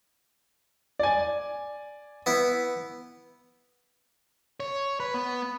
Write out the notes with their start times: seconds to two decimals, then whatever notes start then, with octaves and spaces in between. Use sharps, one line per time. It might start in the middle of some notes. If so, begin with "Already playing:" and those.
0.99 D5 G#5
2.26 B3 E4
4.60 C#5
5.00 B4
5.14 B3